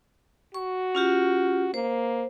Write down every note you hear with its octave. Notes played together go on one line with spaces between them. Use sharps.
F#4 C#6
C#4 F4 G4
A#3 C5